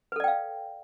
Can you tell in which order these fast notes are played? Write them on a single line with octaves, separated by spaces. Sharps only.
B4 A4 D5 G5 F5